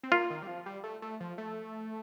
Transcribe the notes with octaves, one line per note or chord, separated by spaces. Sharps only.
C4
A#3 F4
D#3
G3
F3
G3
A3
A3
F3
A3